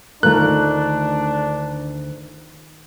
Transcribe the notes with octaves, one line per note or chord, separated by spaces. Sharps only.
D2 D#3 A3 D4 F4 A#4 F#6